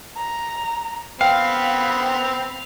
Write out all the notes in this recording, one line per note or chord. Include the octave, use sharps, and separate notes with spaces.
A#5
B3 C4 F5 G5 B5